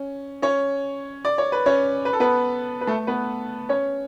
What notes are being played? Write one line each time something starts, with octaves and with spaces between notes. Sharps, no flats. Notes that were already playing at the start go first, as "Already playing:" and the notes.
Already playing: C#4
C#4 C#5
D5
C#5
B4
C#4 C#5
B4
A4
B3 B4
B4
A3 A4
B3 B4
C#4 C#5